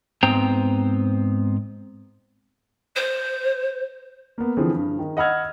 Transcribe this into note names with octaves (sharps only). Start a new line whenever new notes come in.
G#2 B3 C4 C5 G5 A#5
C5
A#3 B3
D3 E3 F3 C4 G#4
G2
D#3
D#5 F#5 B5 E6 F6 G#6